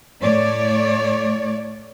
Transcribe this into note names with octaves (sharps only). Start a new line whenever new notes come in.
A2 A3 C#5 D5